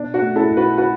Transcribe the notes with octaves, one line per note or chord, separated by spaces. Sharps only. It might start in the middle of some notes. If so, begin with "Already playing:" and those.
Already playing: B2 D4
D4 F#4
A3
E4 A4
B1
F#4 B4
F#4 B4